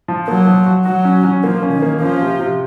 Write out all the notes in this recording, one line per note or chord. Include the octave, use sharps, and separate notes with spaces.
F3
F#3 A#3
F3
F#4
F#3 F#4
C#4
C#4
F3 A#3
C#4
D#3
A#3
F3 C#4
C3
C3